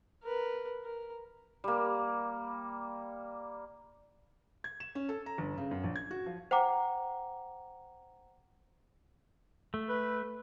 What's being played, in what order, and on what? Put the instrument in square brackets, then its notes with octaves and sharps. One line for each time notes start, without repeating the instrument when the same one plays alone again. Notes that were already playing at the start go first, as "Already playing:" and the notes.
[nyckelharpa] A#4 B4
A#4
[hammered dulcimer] G3 A#3
[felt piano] G#6
E7
C#4
A4
A#5
G1
C#3
F#2
A#1
G#6
F#4
F3
[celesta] C5 F#5 G5 A#5 D6
[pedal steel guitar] A3
[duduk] B4